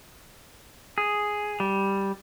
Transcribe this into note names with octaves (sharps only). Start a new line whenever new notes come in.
G#4
G3